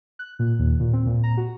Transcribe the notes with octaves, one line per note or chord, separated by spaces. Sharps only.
F#6
A#2
D#2
A#2
C4
A#2
A#5
F#4